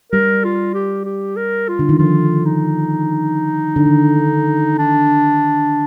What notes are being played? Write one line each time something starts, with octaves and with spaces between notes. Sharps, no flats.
G3 A#4
F4
G4
G4
A#4
F4
D3
D#3
F3 F4
D#4
D3
D#3
D4